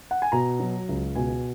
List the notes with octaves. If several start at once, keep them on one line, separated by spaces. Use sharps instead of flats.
F#5
G#5
B2 A#5
F#3
C#2
B2 G#5